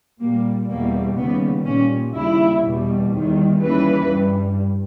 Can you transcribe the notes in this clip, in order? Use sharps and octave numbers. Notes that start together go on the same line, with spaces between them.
A#2 G3 A#3
E2 B2 G3 A#3
D#2 C#3 G3 B3
A#2 G3 C#4
D#2 C#3 G3 E4
E2 B2 G3
E2 D#3 G3
D#2 C#3 E3 G3 B4
G2 G3